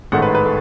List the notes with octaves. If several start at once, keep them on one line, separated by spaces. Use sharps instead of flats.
A1 G#2 D#3 A3 F#5
B4
B4
A3